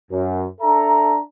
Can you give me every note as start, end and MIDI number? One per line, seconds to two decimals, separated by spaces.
0.11 0.45 42
0.61 1.17 62
0.61 1.17 69
0.61 1.17 76
0.61 1.17 81
0.61 1.17 82